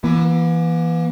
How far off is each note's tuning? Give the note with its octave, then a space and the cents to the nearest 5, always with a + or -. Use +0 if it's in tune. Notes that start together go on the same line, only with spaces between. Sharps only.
E3 +10 A#3 +45